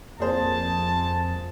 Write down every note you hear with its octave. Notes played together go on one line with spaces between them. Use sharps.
F2 A#3 G#4 C5 A5